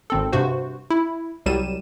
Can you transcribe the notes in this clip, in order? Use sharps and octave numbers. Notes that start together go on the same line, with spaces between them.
G#1 C4 A4
G2 C3 F#4 C5
E4
C2 F#3 G3 D#7 E7